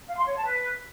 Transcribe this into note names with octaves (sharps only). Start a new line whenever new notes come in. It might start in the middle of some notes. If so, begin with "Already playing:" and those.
F5
C6
C#5
A5
B4